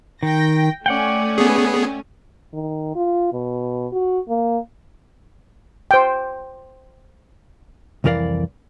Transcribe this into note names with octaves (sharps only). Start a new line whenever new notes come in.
D#3 G5 A#6
A3 C#4 D5 F#5 G5
B3 G#4
D#3
F4
B2
F#4
A#3
C5 G5
C2 F2 E3 A#4 D5 F5